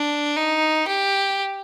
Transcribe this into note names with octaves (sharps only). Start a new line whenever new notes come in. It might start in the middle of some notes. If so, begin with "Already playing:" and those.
Already playing: D4
D#4
G4